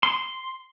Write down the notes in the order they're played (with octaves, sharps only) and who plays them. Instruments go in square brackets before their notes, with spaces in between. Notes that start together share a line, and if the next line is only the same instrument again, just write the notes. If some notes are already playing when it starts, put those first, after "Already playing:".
[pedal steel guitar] C6